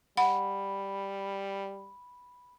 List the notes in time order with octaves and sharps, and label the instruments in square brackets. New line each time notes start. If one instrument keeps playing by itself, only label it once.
[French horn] G3 [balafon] F#5 [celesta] B5